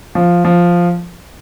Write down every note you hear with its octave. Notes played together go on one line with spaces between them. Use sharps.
F3
F3